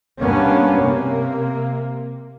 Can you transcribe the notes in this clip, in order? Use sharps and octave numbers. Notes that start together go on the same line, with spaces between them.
G2 A#3 B3 C#4
C3 A#3